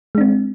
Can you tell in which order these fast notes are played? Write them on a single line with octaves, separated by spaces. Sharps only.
G#3 D4 C4